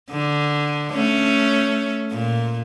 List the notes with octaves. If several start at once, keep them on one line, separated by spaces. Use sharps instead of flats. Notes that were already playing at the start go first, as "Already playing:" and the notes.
D3
A3 C#4
A#2